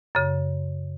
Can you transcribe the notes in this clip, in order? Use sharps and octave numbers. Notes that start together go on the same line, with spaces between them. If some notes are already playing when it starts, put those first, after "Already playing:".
F#2 C#3